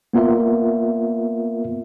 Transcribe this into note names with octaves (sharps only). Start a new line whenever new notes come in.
A#3 B3 F4 A#4 E5